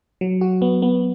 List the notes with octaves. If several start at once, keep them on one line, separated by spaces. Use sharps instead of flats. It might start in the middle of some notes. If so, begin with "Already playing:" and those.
F#3
F#4
B3
B3